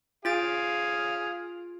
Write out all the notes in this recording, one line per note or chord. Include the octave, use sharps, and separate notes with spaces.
F4 G#4 F5 A6 D7